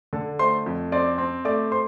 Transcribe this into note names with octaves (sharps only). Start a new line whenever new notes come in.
D3 A4 A5
A3 C5 C6
F2
C4 D5 D6
C4
A3 D5 D6
C5 C6